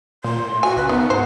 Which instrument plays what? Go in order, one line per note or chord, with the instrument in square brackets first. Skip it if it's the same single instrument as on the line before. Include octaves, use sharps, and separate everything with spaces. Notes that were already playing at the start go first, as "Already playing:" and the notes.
[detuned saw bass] A#2 [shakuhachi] C6
[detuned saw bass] A2
[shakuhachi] F#4 [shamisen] G#5
[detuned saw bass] C#2 [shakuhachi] B4
[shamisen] D#3 [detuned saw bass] B3 [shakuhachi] F#5
[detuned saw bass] G#2 [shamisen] C5